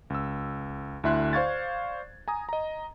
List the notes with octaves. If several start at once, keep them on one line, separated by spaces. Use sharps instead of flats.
C#2 E6
D2 D3 E4 E5 C6 F#6
C5 D5 F5 C#6 G#6 A6
G#5 A#5 D#6
D#5 A#5